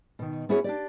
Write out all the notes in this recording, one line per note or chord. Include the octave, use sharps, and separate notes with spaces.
B2 D#3
B3 C#4 E4 F#4 G#4 C#5
D4 G4 D5